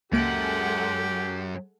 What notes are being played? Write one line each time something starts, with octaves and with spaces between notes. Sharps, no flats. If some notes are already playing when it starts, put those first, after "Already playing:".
C#2 F#2 G#3 A#3 G4 A4 F#5 D7